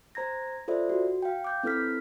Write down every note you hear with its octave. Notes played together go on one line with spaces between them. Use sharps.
C5 A#5 G#6 A#6
F4 A4 C5 D5 E5
F#4
F5 G5
D6 G6
C4 E4 A4 B4 F6 B6